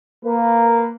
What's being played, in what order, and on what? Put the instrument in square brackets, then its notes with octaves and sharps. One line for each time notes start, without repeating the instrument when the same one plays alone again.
[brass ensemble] A#3 B4